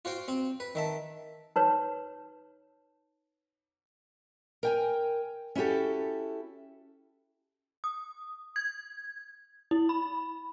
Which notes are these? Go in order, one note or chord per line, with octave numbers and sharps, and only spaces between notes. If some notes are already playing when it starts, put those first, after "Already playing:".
F4 F#4 C5 G5
C4
B4
D#3 E5 A5
D#4 B4 C#5
A#4 G5 G#5
C#4 E4 F#4 G4 A4
D#6
G#6
E4
B5